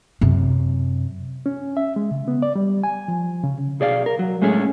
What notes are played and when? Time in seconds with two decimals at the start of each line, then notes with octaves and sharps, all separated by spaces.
0.21 F#2 C3
1.46 C#4
1.77 E5
1.96 G#3
2.11 C#3
2.28 B3
2.42 D5
2.56 G3
2.84 G#5
3.08 F3
3.43 C#3
3.80 B1 G#4 D5 D#5 F5
4.06 A#4
4.19 F#3
4.42 A2 G#3 A3 C#4 G#4